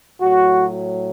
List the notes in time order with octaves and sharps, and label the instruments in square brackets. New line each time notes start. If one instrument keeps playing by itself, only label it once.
[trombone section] A2 F#3 F#4